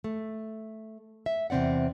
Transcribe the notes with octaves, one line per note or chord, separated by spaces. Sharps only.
A3
E5
E2 C3 C4 D5 F#5